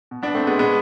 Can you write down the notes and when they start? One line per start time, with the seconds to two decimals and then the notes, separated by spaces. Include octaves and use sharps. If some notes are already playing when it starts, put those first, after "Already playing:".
0.11 B2
0.23 B3 D4
0.34 A3 C4
0.47 G#3 B3
0.59 B2 G#3 B3